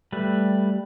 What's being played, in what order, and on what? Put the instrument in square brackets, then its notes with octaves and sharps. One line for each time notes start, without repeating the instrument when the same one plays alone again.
[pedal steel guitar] G3 A3 B4